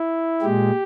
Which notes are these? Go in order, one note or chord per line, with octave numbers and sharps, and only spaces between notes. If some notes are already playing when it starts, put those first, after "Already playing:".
Already playing: E4
A#2 G#3 G4